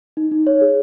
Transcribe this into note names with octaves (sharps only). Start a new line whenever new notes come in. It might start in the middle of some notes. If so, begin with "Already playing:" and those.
D#4
D#4
C#5
G#4